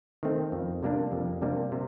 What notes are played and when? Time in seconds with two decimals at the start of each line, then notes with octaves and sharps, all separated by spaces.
0.23 D#3 A3 C4
0.52 F2
0.83 C3 G3 A#3 D4
1.12 F2
1.41 C3 G3 A#3 D4
1.72 C3